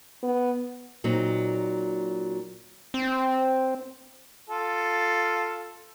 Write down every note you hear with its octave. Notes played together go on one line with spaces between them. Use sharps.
B3
A#2 F#3 C4 D#4
C4
F4 A4